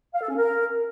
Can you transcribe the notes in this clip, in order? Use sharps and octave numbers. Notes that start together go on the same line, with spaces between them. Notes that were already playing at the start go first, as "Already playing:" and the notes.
F5
A4
C#4
A#4